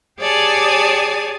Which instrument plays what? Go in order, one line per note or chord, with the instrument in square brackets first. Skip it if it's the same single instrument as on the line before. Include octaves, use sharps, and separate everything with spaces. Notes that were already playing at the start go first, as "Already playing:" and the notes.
[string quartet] G4 G#4 C#5 D5 G#5 A5